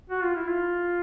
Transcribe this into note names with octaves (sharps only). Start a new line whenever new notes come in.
F#4
F4
E4
F4